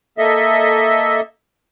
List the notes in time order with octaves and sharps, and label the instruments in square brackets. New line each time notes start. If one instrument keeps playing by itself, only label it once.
[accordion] A#3 A4 D#5 E5